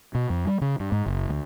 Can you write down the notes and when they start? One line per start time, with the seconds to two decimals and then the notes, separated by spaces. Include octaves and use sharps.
0.15 B2
0.30 F2
0.45 G3
0.61 C#3
0.80 G2
0.92 G#2
1.06 F#1
1.29 D2